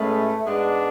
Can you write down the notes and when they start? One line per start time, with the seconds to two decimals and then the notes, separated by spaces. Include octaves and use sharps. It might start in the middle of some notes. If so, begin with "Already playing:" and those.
Already playing: A2 G#3 A3 C#4 G#4 B4
0.45 G#2 G#3 B3 D4